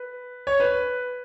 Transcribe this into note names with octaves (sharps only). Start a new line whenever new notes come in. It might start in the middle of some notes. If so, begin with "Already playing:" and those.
Already playing: B4
C#5
B4